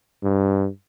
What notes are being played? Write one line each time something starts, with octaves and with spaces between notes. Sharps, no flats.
G2